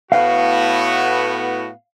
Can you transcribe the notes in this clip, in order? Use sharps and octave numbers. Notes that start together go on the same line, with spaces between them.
A2 B3 F#4 F5